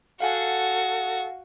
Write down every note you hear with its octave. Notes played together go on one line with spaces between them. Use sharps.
F#4 A4 F5 F#5 G#5